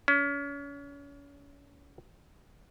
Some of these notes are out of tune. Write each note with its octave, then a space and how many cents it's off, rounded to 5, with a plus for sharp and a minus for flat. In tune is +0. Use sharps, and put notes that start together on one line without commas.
C#4 +35